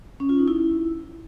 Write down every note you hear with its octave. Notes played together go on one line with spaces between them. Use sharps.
C#4
F4
D#4
E4